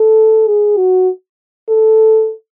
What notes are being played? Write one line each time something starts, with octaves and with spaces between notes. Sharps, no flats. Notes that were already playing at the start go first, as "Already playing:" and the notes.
Already playing: A4
G#4
F#4
A4